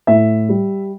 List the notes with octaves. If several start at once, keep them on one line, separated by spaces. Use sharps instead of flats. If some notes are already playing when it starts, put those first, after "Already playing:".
A2 E5
G3